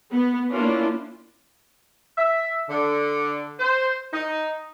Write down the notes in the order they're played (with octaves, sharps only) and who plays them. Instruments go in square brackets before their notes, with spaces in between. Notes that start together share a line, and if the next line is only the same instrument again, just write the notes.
[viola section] B3
A#3 C#4 D4 E4 F4
[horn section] E5
D3
C5
D#4